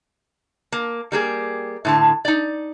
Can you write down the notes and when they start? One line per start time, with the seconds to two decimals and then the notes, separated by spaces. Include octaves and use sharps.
0.72 A#3
1.12 G3 A#3 G#4
1.85 A2 D3 A5
2.25 D#4 D5